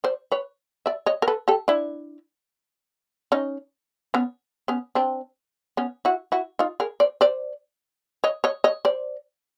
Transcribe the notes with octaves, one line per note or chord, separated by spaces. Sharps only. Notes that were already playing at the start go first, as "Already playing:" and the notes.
C5 D5
B4 C#5
D5 E5
C#5 D#5
A#4
A4 B4
G4 A4
D4 E4
C#4 D#4
B3 C#4
B3 C#4
C4 D4
B3 C#4
E4 F#4
E4 F#4
D#4 F4
G#4 A#4
C5 D5
C5 D5
C#5 D#5
C#5 D#5
C#5 D#5
C5 D5